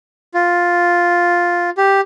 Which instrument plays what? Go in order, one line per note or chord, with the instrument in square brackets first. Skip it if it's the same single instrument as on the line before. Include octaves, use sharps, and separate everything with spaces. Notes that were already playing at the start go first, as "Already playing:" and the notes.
[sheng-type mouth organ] F4
G4